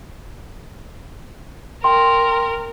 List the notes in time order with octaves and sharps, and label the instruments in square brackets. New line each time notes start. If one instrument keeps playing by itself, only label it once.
[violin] A#4 [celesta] G5 C6